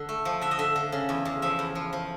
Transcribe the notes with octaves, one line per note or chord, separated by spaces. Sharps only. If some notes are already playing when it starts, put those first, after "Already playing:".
Already playing: D3
A3
F3
D3 E5
D#5
D3 E5
D3
C#3
E2
E2
F3 E5
E2
F3
F3